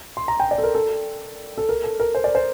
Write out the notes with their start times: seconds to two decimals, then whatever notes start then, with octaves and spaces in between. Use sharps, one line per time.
0.17 C6
0.28 A#5
0.40 G5
0.51 D5
0.58 A4
0.64 A#4
0.75 A4
1.58 A4
1.69 A#4
1.84 A4
2.00 A#4
2.15 C5
2.24 D5
2.35 C5